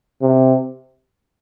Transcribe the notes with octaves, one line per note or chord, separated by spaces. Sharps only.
C3